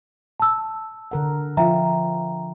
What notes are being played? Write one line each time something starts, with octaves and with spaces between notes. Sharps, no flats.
A5 E6
D3 A#4 F#5
F3 F4 E5 G5 A#5